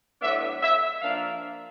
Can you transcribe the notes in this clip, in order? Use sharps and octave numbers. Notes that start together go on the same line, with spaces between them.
A2 F#3 B3 D4 E5
E5
F3 A#3 D4 F5